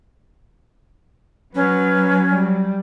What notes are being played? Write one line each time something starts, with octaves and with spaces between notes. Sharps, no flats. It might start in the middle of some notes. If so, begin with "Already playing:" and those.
F#3 C#4 B4
G3